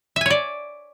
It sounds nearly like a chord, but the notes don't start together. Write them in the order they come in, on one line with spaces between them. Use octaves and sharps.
E5 G#5 C#5 D5